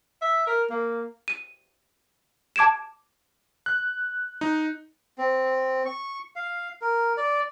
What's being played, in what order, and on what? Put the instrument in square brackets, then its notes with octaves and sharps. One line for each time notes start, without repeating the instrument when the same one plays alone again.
[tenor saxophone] E5
A#4
A#3
[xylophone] D#7
A5 D6 G#6 D7 E7
[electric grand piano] F#6
D#4
[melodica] C4
C#6
F5
A#4
D5